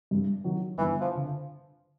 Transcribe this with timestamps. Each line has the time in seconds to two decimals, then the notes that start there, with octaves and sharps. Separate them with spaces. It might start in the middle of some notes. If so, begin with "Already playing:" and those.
0.11 G2
0.44 D#3 F#3
0.78 G1 E3
1.01 F3
1.15 D3